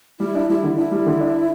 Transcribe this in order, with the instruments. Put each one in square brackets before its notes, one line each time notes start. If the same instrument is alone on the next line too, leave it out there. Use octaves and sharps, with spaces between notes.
[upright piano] G3 [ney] E4
[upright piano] D4
[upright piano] G3 [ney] E4
[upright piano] D3
[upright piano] D4 [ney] E4
[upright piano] G3
D3
D4